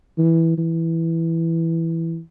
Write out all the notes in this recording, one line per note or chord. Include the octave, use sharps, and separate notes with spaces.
E3
E3